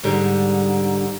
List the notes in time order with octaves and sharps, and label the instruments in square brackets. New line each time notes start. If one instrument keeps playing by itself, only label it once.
[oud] G#2 D3 G3